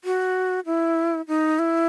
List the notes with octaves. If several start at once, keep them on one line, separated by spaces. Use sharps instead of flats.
F#4
E4
D#4
E4